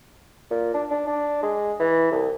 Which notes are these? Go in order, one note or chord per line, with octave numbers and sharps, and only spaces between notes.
A#2
D4
D4
D4
G#3
E3
C2